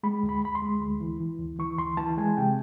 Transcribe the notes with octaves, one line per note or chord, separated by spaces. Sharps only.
G#3 B5
D2
B5
D2 B5
C6
G#3
D2
E3
E3
D2
E3 C#6
D2 C6
E3 A5
G#3 G#5
C3 G5